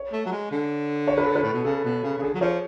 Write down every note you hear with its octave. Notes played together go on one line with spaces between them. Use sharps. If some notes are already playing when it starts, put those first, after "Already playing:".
Already playing: C#5
A3
F#3
G#3
D3
C#5
B4
A4
B4
A2
B2
C#3 A4
B2
C#3
C#3
D3 G#4
F#3
F3 C#5